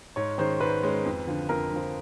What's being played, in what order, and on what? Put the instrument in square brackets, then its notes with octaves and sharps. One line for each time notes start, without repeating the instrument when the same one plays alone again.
[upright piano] G#2 [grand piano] C#5
[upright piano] D#3 G#3 C#4 [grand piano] C5
[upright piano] G#2 [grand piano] B4
[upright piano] D#3 G#3 C#4
F2
D3 F3
[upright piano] F2 [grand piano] A#4
[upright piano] D3 F3